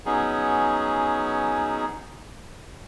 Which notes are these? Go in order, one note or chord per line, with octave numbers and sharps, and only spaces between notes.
F#3 B3 C#4 D#4 G#4